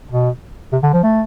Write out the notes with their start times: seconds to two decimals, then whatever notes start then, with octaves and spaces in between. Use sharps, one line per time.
0.11 B2
0.73 C3
0.83 D3
0.93 F3
1.03 A3